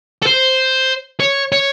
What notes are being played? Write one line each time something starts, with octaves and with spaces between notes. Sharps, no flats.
A4
C5
C#5
C#5